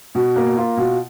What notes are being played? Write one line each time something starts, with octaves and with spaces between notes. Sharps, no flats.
B2
A#3
F4
B2